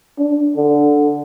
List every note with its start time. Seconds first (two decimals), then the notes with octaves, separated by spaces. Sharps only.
0.18 D4
0.56 D3